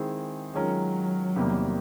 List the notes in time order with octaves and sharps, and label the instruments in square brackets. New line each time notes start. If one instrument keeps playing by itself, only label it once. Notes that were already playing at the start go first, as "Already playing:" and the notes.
Already playing: [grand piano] D#3 G#3 C4 E4 G#4
[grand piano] D#3 G#3 C#4 F4 A#4 [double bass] F#3
[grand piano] E2 C3 D#3 G3 A#3